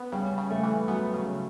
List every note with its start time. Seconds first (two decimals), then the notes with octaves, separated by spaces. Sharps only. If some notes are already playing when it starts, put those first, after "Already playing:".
Already playing: B3
0.12 C#3 G3
0.38 C#3
0.50 A3
0.63 E3
0.88 F#3 B3
1.14 C#3